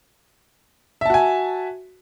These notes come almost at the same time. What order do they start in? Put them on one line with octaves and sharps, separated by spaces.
E5 A5 F#4 G#5